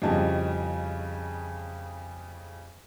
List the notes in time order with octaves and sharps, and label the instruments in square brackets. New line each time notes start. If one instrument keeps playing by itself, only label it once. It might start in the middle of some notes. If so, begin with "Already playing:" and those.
[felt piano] F2 A2 C#3 G3 D#5 A5